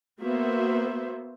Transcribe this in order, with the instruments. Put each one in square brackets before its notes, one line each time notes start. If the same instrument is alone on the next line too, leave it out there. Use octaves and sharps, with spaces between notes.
[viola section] A#3 B3 F#4 C5 E5